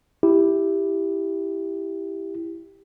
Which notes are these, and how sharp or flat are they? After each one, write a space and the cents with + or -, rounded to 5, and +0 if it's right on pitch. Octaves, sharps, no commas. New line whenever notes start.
E4 +0 G4 +5